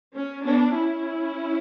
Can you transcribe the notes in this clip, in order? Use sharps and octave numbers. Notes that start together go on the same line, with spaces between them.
C#4
B3 D4
C#4 E4